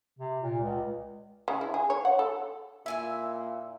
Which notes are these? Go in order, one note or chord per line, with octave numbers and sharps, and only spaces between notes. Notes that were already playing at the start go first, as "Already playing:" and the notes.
C3
A#2
C#2
C#3
E4
G#4
C#5
F#5
A4
A#2 E4 E5 G#5 E6